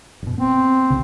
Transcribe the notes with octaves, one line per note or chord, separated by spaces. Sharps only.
F#1 B2
B3 C4
G1 C2 C#3